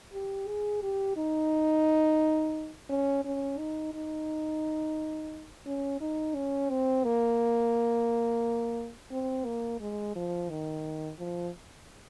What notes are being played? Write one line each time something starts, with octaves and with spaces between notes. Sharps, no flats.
G4
G#4
G4
D#4
C#4
C#4
D#4
D#4
C#4
D#4
C#4
C4
A#3
C4
A#3
G#3
F3
D#3
F3